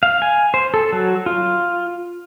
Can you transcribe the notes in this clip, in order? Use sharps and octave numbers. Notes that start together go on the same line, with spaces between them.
F5
G#5
C5
A4
F#3
F4